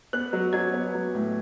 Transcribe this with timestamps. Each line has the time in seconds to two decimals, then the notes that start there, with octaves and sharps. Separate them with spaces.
0.13 B3 F#6
0.33 F#3
0.53 F#3 G#6
0.73 B3
0.94 F#3
1.14 A2